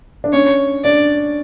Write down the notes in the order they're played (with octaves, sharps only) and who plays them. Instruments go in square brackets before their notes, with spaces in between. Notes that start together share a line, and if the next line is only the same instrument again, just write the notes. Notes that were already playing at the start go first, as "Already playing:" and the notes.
[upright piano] D4
[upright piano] C#4 [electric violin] C#5
[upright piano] D4 [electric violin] D5